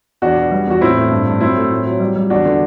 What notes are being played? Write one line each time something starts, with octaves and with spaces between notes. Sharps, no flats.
E2 D4 F#4
B2
G3
E2 F#4
A2 C4 E4
A2
G2
G2
F#3 C4 E4
A3
A2
F#3
G3
G3
E2 D4 F#4
D3